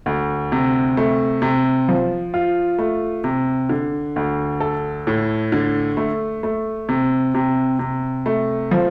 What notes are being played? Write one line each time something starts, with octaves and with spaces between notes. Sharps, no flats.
D2
C3
A3
C3
F3
F4
A3
C3
D3
D2
A4
A2
D3
A3
A3
C3
C3
C3
A3
F3